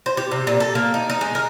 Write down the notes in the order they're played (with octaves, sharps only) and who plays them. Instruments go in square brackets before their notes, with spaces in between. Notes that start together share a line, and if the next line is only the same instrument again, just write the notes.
[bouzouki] C5
G4
C3
A#2
A4
A#3
D#4
D#4
G#3
A#4